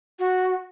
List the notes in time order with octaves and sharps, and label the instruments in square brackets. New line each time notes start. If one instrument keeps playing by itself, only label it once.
[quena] F#4